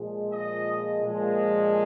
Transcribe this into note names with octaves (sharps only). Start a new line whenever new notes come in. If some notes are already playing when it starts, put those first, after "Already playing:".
Already playing: A#2 F3 G#3
D#5
A#2 F3 G#3